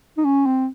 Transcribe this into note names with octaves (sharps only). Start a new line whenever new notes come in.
D#4
C#4
C4